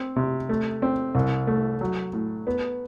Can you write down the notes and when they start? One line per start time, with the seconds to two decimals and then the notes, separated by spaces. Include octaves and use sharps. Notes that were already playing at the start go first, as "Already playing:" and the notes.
Already playing: C4
0.16 C3
0.49 A3
0.82 C4
1.15 C2
1.47 A3
1.81 F#3
2.13 A2
2.47 B3